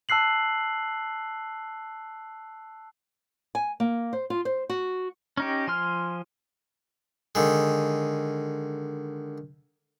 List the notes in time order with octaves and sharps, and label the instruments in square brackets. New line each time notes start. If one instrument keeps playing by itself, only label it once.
[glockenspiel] A5 E6 F#6 C7 F#7
[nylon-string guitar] G#5
A#3
C5
F4
C5
F#4
[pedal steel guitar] C#4 D#4 G4
F3 G#5 C6 F6
[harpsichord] D3 D#3 G#3